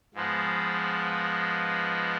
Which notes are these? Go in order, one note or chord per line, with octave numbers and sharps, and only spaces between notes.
G#2 F3 G#3 B3